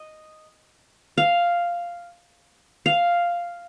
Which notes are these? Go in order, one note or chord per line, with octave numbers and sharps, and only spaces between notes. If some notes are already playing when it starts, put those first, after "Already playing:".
Already playing: D#5
F5
F5